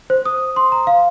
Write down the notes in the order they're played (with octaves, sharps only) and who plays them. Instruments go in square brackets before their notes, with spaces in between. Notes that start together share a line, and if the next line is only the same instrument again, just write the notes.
[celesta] C5
D#6
C6
A#5
F5